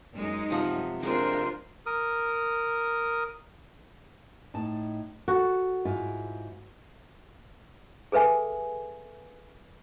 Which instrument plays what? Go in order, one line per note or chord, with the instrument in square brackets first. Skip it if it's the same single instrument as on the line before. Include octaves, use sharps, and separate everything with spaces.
[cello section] F#2 G#3 D#4
[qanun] C3 F3 F#5
[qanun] G#3 [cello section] C4 D4 F4 [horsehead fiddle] A#4 C5
[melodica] A#4 D#6
[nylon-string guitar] A2 D#4 A5
[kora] F#4 [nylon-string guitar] A4
[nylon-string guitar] G#2 E4 F4
[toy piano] G#4 A4 B4 E5 G#5